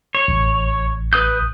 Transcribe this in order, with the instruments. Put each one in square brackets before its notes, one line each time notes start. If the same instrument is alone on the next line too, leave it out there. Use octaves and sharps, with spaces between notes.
[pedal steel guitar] C#5
[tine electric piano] A1
[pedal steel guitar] B4 D#6 G6